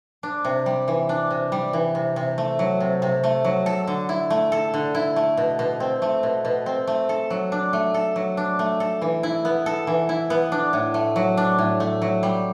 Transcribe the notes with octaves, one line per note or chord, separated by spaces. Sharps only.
D4
C3
G3
E3
D4
C3
G3
E3
C3
C3
A3
F#3
C3
C3
A3
F#3
A4
D3
E4
A3
A4
D3
E4
A3
B2
B2
C4
A3
B2
B2
C4
A3
A4
F#3
D4
A3
A4
F#3
D4
A3
A4
E3
E4
B3
A4
E3
E4
B3
D4
A2
A3
F#3
D4
A2
A3
F#3
G3